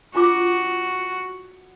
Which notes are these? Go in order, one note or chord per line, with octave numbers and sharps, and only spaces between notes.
D4 F4 F#4 D6